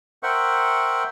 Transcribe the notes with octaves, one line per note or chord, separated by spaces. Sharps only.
A#4 C5 E5 F#5 G5 C#6